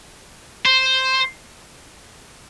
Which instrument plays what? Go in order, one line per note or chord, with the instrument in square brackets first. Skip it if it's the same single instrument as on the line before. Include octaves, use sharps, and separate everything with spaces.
[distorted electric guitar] C5